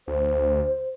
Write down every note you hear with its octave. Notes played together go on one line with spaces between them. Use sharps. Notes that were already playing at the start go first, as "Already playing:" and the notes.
D2 C5